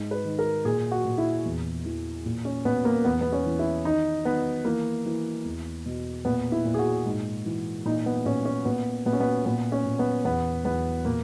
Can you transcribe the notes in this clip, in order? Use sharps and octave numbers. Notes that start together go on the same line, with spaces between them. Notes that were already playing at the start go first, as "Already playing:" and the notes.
Already playing: G#2
B4
D#3
A#4
A#2 G#4
F#4
A#2
E4
E2
E3
A#2
C#4
A#2 B3
A#3
E2 B3
B3
C#4
E3
E4
D#3 D#4
D#3 B3
E3 A#3
E3
E2
B2
A#2 B3
E4
A#2
G#4
F#4
G#2
E3
A#2 D#4
B3
A#2 C#4
C#4
A#2 B3
A#2 B3
C#4
B3
A#2 B3
C#4
A#2
B3
E2 B3
E2 B3
A#2 A#3